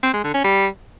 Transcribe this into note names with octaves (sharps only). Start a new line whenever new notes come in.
C4
G#3
D3
C#4
G3